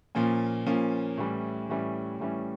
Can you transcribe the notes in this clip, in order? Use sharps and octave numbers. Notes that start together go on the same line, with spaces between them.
A#2 F3 A#3 C#4
A#2 F3 A#3 C#4
A2 E3 G3 C#4
A2 E3 G3 C#4
A2 E3 G3 C#4